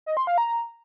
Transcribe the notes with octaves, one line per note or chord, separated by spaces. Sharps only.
D#5
C6
F5
A#5